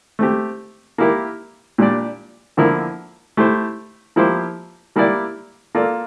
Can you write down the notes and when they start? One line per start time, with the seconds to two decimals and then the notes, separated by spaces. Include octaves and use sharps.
0.19 A3 C4 G4
0.98 A#3 E4 G4 A#4
1.78 A#2 G3 D4 G4 D5
2.57 D3 F3 A#3 E4 A#4
3.37 A3 E4 G4 C5
4.16 F3 A#3 E4 G4 C5
4.96 G3 A#3 E4 G4 D5
5.75 A#3 F4 A4 D5